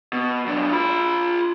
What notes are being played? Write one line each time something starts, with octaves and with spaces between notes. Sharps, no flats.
B2
F#2 D4
F4 B5